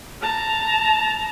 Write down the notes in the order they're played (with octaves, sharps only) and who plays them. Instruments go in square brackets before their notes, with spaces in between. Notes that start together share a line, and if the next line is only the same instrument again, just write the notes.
[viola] A5 A#5